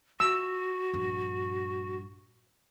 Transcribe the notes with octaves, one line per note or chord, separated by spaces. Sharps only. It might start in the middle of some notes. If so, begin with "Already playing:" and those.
F4 F#4 E6
A#1 G2